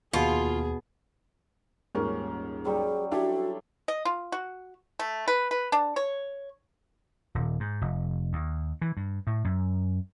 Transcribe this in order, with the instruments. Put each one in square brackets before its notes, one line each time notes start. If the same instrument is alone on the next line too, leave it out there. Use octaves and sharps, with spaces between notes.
[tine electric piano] D#2 [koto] B2 [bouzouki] F4 [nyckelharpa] G#4
[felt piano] D#1 G#2 A#4 [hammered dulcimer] C#4
[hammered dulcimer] F#3 G3 [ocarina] G#4
[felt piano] D4 E4 G4 [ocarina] F#4 [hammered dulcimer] A4
[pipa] D#5
F4
F#4
A3
B4
B4
D4
C#5
[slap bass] D#1
G#2
F1
D#2
E3
G2
A2
F#2